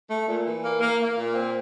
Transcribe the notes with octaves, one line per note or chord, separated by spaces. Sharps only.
A3
A#2
E3
A#3
A#3
A#3
A#2
C4